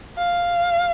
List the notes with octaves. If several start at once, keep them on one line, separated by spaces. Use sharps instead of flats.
F5